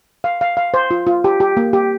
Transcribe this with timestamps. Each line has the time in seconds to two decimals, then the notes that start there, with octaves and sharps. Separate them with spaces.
0.24 F5
0.41 F5
0.57 F5
0.74 C5
0.91 F4
1.07 F4
1.24 G4
1.40 G4
1.57 A#3
1.73 G4